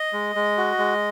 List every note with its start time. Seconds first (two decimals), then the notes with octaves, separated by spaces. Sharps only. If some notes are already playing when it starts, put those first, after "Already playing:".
Already playing: D#5
0.13 G#3
0.36 G#3
0.58 F#4
0.79 G#3